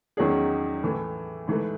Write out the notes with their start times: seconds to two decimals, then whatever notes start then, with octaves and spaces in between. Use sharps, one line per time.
0.17 E2 D#3 F#3 C#4 G#4
0.83 A2 E3 A3
1.47 G#2 E3 A3